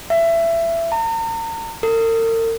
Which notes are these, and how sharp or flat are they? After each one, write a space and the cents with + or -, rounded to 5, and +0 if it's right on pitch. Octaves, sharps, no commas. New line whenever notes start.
E5 +20
A#5 -40
A#4 -45